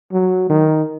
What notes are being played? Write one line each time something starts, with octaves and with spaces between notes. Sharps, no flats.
F#3
D#3